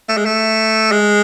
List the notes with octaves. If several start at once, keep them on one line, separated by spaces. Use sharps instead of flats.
A3
G#3
A3
G#3